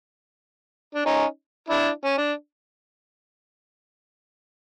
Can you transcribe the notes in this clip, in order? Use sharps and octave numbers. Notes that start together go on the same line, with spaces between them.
D4
C#4 D#4
D4 E4
C#4
D4